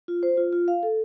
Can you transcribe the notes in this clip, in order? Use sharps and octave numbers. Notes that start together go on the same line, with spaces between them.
F4
C5
F4
F4
F5
A4